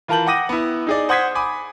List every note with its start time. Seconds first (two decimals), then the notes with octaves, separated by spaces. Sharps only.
0.08 E3 F4 A#4 A5 G6 F#7
0.27 F#5 G5 D6 D#6 A#6 D#7
0.49 B3 E4
0.87 D#4 G#4 D5
1.09 C5 F#5 D#6 G#6 B6 C7
1.35 G#5 B5 D6 D#6